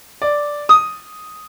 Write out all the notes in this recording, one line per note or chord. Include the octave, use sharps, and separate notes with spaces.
D5
D#6